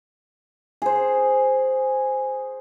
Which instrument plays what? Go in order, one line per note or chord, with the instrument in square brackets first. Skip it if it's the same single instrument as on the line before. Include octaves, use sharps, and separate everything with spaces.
[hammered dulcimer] G#4 C5